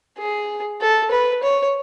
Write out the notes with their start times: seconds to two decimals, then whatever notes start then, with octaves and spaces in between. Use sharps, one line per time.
0.18 G#4
0.81 A4
1.11 B4
1.43 C#5